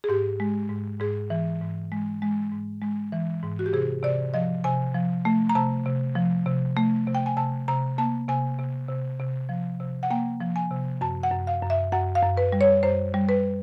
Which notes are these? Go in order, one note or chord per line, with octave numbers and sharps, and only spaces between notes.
G#4
G#2 G4
G#3
G#2
G#2 G#4
E3
G#2
G#3
G#3
G#2
G#3
E3
G#2
F#4
G4
C3 G#4
C3 D5
F3 D#5
C3 G#5
F3
A3
A#5
C3 A5
C3
F3
C3
A3
C3
G5
G#5
C3 A5
C3 A#5
A#3 A5
C3 G#5
C3
C3
C3
F3
C3
F#5
A#3 G5
F3
G#5
C3
F#2 A5
F#5
F#2
F5
F#2
E5
F#2 F#5
F5
F#2
B4
G3
C#5
F#2 C5
G3
B4